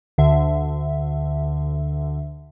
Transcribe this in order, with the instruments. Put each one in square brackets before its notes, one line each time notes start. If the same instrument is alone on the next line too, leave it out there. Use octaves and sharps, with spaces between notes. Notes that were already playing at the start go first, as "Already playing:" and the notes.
[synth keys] D2 D3 E5